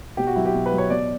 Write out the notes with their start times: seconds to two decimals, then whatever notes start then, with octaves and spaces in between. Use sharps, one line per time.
0.17 B2 G4
0.27 F#4
0.36 F#3 E4
0.45 G4
0.54 B2
0.66 B4
0.72 F#3
0.78 C#5
0.90 B2 D5